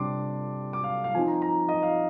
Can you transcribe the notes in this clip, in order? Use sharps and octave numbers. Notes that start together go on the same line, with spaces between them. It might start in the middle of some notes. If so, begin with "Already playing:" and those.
Already playing: C3 G3 D4 C6 D6
D6
F5
F5
F3 C4 D#4 G#5
A#5
A#5
D#5
F5